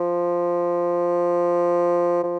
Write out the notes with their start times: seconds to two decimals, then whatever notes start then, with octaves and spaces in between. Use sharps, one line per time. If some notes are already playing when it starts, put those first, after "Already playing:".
Already playing: F3
2.23 F3